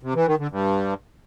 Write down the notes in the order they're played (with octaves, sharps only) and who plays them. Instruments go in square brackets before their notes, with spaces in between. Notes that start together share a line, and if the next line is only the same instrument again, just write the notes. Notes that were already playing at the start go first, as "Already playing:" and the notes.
[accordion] C3
E3
D#3
D3
G2